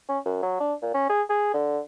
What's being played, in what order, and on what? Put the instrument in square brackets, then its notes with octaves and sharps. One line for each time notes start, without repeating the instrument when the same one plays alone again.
[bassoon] C#4
F#2
F#3
D4
A#2
C#4
G#4
G#4
D3